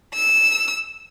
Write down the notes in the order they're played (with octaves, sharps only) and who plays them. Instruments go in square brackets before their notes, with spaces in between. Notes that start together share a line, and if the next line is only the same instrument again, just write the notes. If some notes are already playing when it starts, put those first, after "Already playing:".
[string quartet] E6